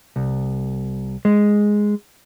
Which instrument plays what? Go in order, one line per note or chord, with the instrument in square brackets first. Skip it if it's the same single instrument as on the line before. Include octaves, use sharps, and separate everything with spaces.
[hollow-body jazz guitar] C2
G#3